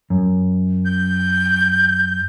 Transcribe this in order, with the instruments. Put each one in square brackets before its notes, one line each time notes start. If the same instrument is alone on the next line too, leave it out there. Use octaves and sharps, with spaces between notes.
[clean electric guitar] F#2
[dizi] G6